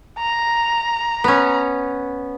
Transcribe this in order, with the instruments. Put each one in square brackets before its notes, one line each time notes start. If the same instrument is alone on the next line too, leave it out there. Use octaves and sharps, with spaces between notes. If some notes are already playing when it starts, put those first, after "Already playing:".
[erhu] A#5
[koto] B3 C#4